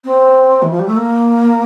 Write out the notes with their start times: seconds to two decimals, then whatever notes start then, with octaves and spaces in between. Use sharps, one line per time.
0.05 C4
0.62 E3
0.71 F3
0.79 G3
0.88 A3
0.97 A#3